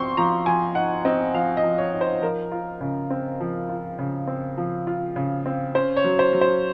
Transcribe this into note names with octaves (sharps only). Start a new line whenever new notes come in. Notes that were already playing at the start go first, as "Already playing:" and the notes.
Already playing: F3 C4 C6 C#6
F3 A#5
F3 G#5
D#4 F#5
C4 D#5
F3 F5
D#5
F3
C#5
D#4
C5
F3 A#4
F4
C#3
C4
F3
F4
C#3
C4
F3
F4
C#3
C4
C#4 C5
C#5
F#3
C5
F#3
C5